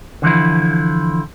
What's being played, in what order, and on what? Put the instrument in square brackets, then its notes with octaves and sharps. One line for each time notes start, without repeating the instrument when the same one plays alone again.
[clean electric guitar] D3 E3 F3 E4